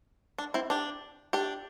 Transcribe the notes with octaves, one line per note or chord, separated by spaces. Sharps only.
D4
C4 E4
D4 G4
D4 G4